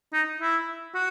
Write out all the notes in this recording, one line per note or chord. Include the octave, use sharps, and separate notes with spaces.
D#4
E4
F#4